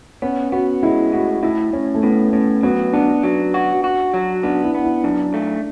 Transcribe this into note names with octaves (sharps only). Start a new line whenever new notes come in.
B3 C#4
B3 F#4
G#3 E4
A2 F#4
A2 E4
A2 C#4
A3
A2 B3
A2 C#4
F#3 B3
B3 D4
F#3
F#4
F#4
F#3
B3 D4
E4
B3
E4
F#2 D4
A3